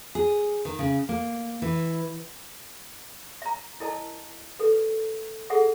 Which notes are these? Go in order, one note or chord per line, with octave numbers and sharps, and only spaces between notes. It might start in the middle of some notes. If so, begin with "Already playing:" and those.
G#4
D#3
C#3
A#3
E3
E5 A#5
E4 A#4 D#5 A5
A4 B4
G#4 A4 E5 F#5